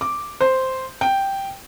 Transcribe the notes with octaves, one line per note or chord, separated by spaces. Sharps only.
D6
C5
G5